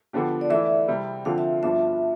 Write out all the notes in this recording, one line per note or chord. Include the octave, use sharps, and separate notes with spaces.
D3 F3 B3 D4 G4
D5
E3 A3 E4 E5
C3 G3 C4 E4
D3 F3 C4 F5
E5
G2 F3 B3 D4 E5